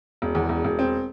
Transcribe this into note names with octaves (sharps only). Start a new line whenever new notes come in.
E1
E2
E1
E1
C4